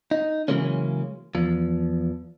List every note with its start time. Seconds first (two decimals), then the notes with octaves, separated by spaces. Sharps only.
0.11 D#4
0.48 C#3 E3 F#3 G#3 A#3 C#4
1.35 E2 F3